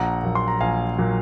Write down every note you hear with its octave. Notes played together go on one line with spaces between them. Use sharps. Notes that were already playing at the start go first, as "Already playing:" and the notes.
Already playing: A#1 F#5 A#5
A#2 F#3
C6
A#5
A#1 F5 G#5
A#2 F#3